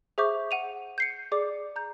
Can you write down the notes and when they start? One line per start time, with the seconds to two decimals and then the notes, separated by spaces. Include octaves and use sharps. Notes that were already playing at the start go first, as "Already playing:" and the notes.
0.18 G#4 C5 E5 C#6 D6 G6
0.51 F#5 D#7 F7
0.98 G6 C7 C#7
1.32 G#4 D5 D6
1.76 A#5 G6